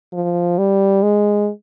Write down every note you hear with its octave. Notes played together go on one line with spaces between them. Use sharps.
F3
G3
G#3